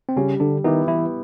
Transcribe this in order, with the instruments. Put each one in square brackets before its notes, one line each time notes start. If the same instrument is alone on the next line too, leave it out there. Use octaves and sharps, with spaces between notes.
[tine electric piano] C4
[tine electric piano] C#3 C#4 [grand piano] G3
[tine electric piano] D3 D4
[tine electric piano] D#3 D#4 [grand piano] B3 E4 G4
[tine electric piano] E3 E4